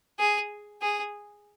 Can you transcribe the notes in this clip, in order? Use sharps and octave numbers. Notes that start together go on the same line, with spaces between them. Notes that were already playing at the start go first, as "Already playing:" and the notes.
G#4
G#4